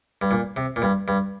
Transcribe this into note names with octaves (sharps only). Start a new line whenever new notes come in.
G2
A#2
C3
A#2
G2
G2